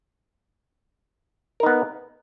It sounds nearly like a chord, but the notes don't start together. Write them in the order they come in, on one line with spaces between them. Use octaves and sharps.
A#4 D#4 B3